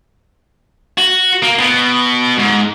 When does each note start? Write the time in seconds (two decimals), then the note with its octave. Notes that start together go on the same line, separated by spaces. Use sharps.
0.98 F#4
1.42 A#3
1.59 B2
2.38 G#2